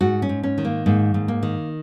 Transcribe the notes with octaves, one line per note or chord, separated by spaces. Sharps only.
G#2 F#4
C#4
G#2
C#4
D#3
A#3
G#2 A#3
G#2
A#3
D#3